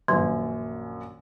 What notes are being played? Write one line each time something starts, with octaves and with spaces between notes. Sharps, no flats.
A#1 F#2 D#3